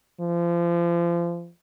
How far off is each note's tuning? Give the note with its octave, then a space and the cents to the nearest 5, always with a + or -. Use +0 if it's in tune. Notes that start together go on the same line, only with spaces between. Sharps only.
F3 -30